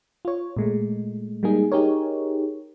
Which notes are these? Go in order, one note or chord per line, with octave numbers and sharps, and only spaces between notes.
F4 C#5
A#2 G#3 A3
G3 G#3 A#3 D#4 G#4
D#4 G4 G#4 A#4 C#5